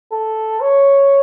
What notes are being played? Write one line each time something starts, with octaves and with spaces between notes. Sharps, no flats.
A4
C#5